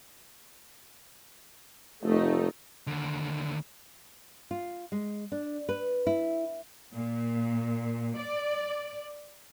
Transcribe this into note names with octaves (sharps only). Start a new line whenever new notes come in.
F1 A3 D#4
D#2 D3
F4
G#3
D4
B4
E4
A#2
D5